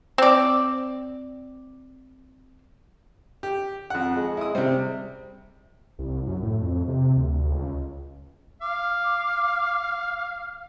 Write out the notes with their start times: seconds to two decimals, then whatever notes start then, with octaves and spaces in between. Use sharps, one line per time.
0.18 C4 D5
3.43 G4
3.90 F2 F#5
4.16 G#3
4.37 E4 D#6
4.55 C3 G3 C4
5.99 C2
6.27 F#2
6.43 A2
6.61 F2
6.88 C3
7.17 D2
7.51 C#2
8.61 F5 D6